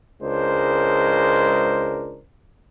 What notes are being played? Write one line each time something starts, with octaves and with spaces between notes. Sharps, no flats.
C#2 G#3 D4 A#4 C5